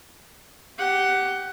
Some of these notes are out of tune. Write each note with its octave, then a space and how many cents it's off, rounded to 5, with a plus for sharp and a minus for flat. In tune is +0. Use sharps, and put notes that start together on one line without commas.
G4 -5 F#5 +10